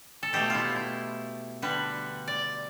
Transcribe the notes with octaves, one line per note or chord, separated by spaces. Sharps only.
A4
B2 A3 G4
E4 F4
E4
D3 G3 B4
D5